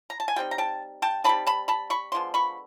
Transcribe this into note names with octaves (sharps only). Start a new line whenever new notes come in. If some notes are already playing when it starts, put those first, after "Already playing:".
A#5
A5
G#5
G3 C4 D#4 G5
A#5
G5 A5
G5 A5
G3 C4 D#4 A5 B5
A5 B5
A5 B5
B5 C#6
D3 F3 G#3 B3 C6
B5 C#6